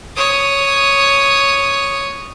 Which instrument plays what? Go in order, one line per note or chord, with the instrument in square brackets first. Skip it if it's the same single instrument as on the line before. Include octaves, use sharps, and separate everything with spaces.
[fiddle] C#5 D#6